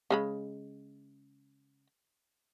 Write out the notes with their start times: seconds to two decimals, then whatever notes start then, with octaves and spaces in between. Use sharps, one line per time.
0.10 C#3 G#3 B5